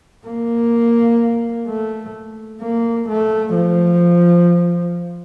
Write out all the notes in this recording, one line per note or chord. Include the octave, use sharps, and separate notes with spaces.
A#3
A3
A#3
A3
F3